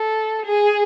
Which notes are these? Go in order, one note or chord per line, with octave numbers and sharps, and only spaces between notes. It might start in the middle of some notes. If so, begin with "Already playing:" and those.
Already playing: A4
G#4